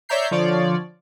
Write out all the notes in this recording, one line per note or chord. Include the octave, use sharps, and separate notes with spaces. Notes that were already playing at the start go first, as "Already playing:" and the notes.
C#5 D5 E5 A#5 G6 C7
D3 F3 F4 C#5 D5